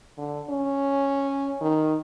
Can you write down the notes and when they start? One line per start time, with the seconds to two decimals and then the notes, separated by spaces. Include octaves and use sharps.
0.18 D3
0.50 C#4
1.61 D#3